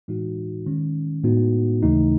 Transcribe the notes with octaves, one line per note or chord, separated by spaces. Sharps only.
A2 E3 G#3 D#4 F#4
D#3 G#3 C#4
A2 G#3 B3 D#4 F#4
D#2 C#3 E3 A3 D#4